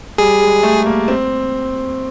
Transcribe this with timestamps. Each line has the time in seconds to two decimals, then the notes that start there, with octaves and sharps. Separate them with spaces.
0.18 G3 G#4
0.41 G#3
0.63 A3
0.86 A#3
1.08 C4